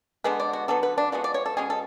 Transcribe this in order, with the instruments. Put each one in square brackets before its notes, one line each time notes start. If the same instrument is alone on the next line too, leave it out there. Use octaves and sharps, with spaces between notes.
[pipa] D3 G#3 B3 B4
D5
F#4
D3 F#3 B3 A4
B4
D4
F3 G#3 B3 F#4
D5
C#5
A4
B2 G#3 C#4 G#4
A4